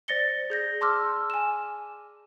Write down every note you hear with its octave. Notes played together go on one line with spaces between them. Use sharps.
C5 D5 A6 A#6 C#7 G7
G#4 G6 A#6
A5 C6 D6 E6 F6
G#5 E7